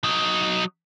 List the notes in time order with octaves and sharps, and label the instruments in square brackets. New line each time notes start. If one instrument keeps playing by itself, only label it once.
[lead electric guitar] F#3 D#4